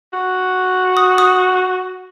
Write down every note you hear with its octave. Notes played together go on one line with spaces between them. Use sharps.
F#4
D#6
D#6